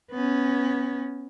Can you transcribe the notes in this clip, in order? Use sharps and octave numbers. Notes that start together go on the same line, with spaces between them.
B3 C#4